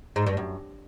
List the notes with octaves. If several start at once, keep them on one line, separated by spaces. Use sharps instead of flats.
G#2
G2
F#2